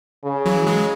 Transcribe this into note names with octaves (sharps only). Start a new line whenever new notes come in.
C#3
E3 F#3
F#3 G#3